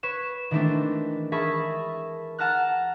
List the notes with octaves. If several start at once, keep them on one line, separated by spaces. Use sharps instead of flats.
B4 C#5 C#6 E7
D#3 E3 G#3 A3 C4 D4
G#4 A#4 E5 A5 B5 C#6
F#5 A5 A#5 F6 F#6